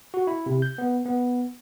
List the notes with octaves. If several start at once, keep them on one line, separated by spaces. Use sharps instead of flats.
F#4
E4
C3
G6
B3
B3